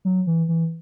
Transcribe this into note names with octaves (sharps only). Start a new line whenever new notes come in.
F#3
E3
E3